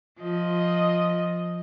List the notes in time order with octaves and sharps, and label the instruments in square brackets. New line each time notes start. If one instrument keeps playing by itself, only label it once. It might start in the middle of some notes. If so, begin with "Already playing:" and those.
[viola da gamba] F3 D#5